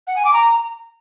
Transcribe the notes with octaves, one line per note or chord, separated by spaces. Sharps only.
F#5
G#5
D6
A#5